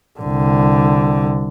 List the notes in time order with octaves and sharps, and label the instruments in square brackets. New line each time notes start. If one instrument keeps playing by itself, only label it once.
[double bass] C2 D3